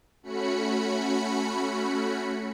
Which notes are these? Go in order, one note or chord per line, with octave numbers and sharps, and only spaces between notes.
A3 C#4 F#4 B5 C#7